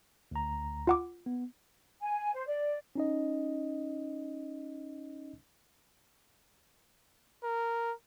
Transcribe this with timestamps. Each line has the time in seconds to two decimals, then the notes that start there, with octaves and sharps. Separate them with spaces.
0.31 D2 A#5
0.87 F4 F#5 D6
1.26 B3
2.00 G#5
2.33 C5
2.46 D5
2.96 C#4 D#4 D#5
7.44 A#4